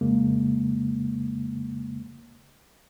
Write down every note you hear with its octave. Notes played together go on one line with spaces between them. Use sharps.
F2 C#3 G#3 A#3